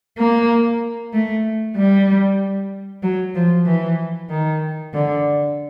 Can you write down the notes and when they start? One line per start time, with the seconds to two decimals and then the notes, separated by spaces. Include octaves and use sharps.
0.18 A#3
1.13 A3
1.76 G3
3.03 F#3
3.35 F3
3.66 E3
4.29 D#3
4.94 D3